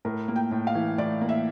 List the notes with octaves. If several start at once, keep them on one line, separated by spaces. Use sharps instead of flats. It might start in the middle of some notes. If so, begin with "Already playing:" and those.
A2 A#4
A#3
G5
A2
F5
E3
A2 D5
A#3
E5